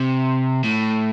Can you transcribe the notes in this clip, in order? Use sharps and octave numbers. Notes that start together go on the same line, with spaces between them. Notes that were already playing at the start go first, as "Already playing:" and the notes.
Already playing: C3
A2